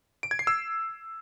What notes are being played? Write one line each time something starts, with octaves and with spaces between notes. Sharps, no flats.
D7
G#6
C7
E6